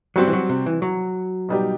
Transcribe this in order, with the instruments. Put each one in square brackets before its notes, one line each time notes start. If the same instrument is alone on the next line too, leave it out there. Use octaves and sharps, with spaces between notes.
[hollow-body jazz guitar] F#3 [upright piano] G3 C4 F#4
[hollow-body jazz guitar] E3
F#3
C3
E3
F#3
[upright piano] B2 G3 D#4 G4